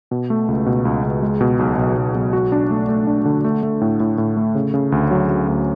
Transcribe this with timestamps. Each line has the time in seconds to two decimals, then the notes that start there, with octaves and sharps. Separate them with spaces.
0.11 B2
0.30 A3
0.48 C#2
0.66 B2
0.85 C#2
1.04 C#2
1.22 G#3
1.41 B2
1.59 B1
1.77 B1
1.96 B1
2.15 B1
2.33 F#4
2.52 D4
2.70 A3
2.89 A3
3.07 D4
3.25 D3
3.44 A3
3.63 A3
3.81 A2
4.00 A2
4.18 A2
4.37 A3
4.55 C#3
4.74 C#3
4.92 D2
5.11 F#3
5.29 F#3
5.48 D2